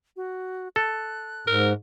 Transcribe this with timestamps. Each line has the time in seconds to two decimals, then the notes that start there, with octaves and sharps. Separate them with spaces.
0.16 F#4
0.76 A4 F#6
1.47 G#2 A#4